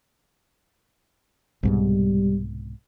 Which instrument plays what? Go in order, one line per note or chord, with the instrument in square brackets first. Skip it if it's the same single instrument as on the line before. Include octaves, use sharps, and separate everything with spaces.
[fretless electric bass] C2 G#2 B2 [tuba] G3